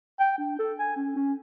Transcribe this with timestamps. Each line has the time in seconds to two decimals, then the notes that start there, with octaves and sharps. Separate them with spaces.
0.20 G5
0.38 D4
0.59 A4
0.79 G#5
0.97 C#4
1.16 C#4